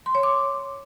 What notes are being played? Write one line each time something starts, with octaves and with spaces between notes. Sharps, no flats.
C6
C#5
D6